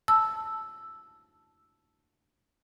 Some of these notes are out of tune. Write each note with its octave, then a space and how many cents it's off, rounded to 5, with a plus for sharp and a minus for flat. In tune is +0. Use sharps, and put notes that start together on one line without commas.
A5 -5 E6 +0